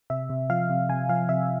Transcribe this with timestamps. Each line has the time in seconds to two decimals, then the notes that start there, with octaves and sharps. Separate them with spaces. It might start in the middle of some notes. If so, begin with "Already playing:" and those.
0.10 C3 E5
0.30 C3
0.50 F3 F5
0.69 C3
0.89 C3 G#5
1.09 F3 F5
1.29 C3 E5